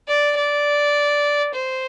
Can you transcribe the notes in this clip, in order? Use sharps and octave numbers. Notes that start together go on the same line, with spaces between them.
D5
D5
C5